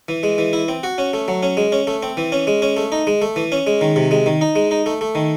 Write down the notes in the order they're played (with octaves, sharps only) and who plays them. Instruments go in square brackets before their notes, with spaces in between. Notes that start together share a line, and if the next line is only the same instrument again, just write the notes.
[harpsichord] E3
G#3
E3
E4
C4
F#4
C#4
A3
F#3
C#4
G#3
C#4
A3
C4
E3
C#4
G#3
C#4
A3
D#4
G#3
A3
E3
C#4
G#3
D#3
C3
G#3
D#3
D#4
G#3
D#4
A3
A3
D#3